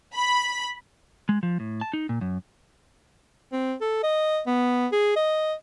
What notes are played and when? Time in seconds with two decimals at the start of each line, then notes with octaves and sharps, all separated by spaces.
0.14 B5
1.29 G#3
1.43 F3
1.60 A2
1.81 A5
1.93 D#4
2.09 A#2
2.21 F#2
3.52 C4
3.81 A4
4.03 D#5
4.47 B3
4.92 G#4
5.16 D#5